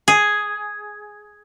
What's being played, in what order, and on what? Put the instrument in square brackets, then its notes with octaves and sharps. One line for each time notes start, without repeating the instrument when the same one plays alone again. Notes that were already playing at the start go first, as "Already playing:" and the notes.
[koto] G#4